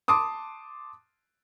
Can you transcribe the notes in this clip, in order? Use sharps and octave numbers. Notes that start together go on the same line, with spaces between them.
A5 C6 D6 D#6